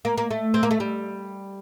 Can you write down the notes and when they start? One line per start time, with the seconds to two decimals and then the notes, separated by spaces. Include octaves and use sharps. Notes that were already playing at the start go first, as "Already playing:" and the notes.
0.05 A#3
0.18 A#3
0.31 A3
0.54 C4
0.63 A#3
0.71 A3
0.80 G3